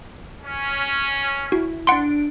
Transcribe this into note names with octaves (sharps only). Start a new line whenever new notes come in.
C#4
E4 F#4
D4 F#5 C6 D7